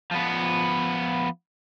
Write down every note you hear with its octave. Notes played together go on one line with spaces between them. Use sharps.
F3 B3